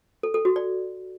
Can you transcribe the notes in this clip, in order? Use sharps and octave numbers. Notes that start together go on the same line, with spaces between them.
A4
A4
F#4
D5